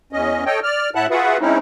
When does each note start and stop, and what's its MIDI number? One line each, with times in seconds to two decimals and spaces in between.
0.13 0.44 40
0.13 0.44 61
0.13 0.44 75
0.46 0.60 69
0.46 0.60 73
0.46 0.60 75
0.46 0.60 79
0.63 0.90 74
0.63 0.90 89
0.95 1.07 45
0.95 1.07 64
0.95 1.07 76
0.95 1.07 78
0.95 1.07 81
0.95 1.07 90
1.10 1.37 65
1.10 1.37 66
1.10 1.37 68
1.10 1.37 71
1.10 1.37 76
1.10 1.37 78
1.40 1.58 56
1.40 1.58 60
1.40 1.58 61
1.40 1.58 63
1.40 1.58 64